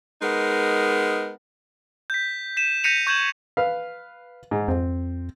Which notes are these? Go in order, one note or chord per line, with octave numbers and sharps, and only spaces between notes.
G#3 B3 D#4 A#4
G6 B6
B6 D#7 E7
G6 A#6 B6 C#7 D#7 F7
C#6 G6 G#6 E7 F#7
B4 F5
G#2
F2 C4